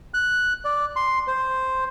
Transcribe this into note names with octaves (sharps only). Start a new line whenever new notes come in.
F#6
D5
C6
C5